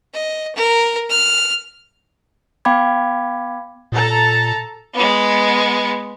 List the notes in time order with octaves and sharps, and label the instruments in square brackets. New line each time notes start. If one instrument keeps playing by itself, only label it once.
[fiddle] D#5
A#4
F6
[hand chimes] B3 F5 G5 B5 D6 G#6
[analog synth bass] A#2 [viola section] A4 A5 A#5
[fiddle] G#3 B3